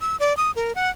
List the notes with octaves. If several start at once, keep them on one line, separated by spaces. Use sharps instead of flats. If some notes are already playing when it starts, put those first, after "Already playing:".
E6
D5
D#6
A#4
F#5